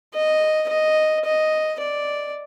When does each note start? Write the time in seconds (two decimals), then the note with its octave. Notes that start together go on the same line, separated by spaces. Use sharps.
0.14 D#5
0.69 D#5
1.25 D#5
1.80 D5